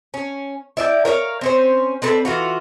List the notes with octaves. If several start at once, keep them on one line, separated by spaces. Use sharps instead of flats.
C#4
E4 D5 D#5 G5
A#4 C#5 E5 F5
C4 C#4 C5
C4 D4 A4 B4
E3 F4 F#4